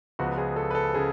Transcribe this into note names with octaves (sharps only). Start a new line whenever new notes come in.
C#2 C#3 F3 B3 F#4
G#4
A4
B4
A4
C#3 G#4